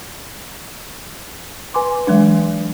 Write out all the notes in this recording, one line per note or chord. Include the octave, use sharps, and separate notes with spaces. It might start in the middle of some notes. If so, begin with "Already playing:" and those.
B4 G#5 C6 D6
E3 F#3 G#3 D4